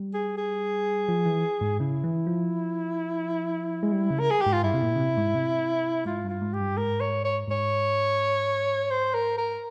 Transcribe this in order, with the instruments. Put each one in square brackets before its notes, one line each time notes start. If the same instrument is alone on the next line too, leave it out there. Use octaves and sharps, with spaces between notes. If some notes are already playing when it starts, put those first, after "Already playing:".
Already playing: [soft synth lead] G3
[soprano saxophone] G#4
G#4
[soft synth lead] F3
E3
G#2
[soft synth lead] C#3 [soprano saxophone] E4
[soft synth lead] E3
F3
G#3
G3
C#3
[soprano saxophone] A#4
G#4
[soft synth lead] G#2 [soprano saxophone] G4
[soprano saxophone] F4
[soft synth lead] G2 [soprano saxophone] E4
[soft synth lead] C3
A#2
C#3
C3
G#2
C3
[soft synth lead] G#2 [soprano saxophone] F4
[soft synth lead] G2
[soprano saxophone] F4
[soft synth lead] G#2
[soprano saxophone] G4
[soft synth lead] G2
[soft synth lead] G#2 [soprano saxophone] A#4
[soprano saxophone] C#5
C#5
[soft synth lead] G#2 [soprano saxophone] C#5
[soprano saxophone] C5
A#4
A#4